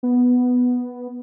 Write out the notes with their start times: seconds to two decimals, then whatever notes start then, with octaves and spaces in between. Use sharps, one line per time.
0.03 B3